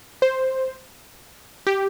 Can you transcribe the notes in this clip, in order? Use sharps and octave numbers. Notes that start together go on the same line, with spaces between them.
C5
G4